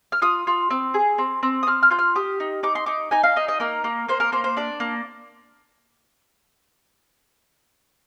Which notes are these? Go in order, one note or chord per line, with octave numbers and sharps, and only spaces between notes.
F6
F4 D#6
F4
C4
G#4
C4
C4
D#6
C4 F6
F6
F4 G6
F6
G4 D#6
D#4
D#4 D6
C6
D#4 D6
D#4 G#5
F5
D#4 D#5
D#5
A#3 A#4
A#3
A#3 C5
A#4
A#3 C5
C5
D4 D5
A#3